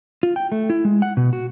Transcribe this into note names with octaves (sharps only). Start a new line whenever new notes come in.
F4
G5
A3
E4
G#3
F#5
B2
F#4